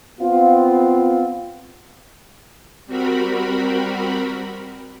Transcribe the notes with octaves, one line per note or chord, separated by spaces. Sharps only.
B3 C4 F4
G3 C4 F#4 A#4 B5